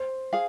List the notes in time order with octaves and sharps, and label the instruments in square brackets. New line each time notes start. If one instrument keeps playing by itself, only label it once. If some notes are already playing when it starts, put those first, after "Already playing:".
Already playing: [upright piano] C5
[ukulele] G#4 F5